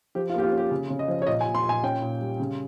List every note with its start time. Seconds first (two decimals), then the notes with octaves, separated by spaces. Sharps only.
0.15 F3 G4
0.30 F4
0.34 A#3 G4
0.43 F4
0.52 C#4
0.58 G4
0.71 C#3
0.90 C#3
0.99 D#5
1.08 F3
1.22 C#5
1.27 A#2 D#5
1.41 G#5
1.45 A#2
1.55 C6
1.64 A#2
1.69 G#5
1.83 C#4 G5
2.02 A#2
2.20 G3
2.40 C#3